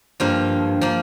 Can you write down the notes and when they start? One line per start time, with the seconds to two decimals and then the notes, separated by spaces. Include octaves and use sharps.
0.20 G2 F3 A#3 F4
0.81 F3 A#3